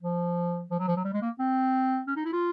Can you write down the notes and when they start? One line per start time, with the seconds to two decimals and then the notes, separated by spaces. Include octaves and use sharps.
0.03 F3
0.71 F3
0.79 F#3
0.88 F3
0.96 F#3
1.04 G3
1.14 G#3
1.22 A#3
1.39 C4
2.07 C#4
2.16 D#4
2.25 E4
2.33 F4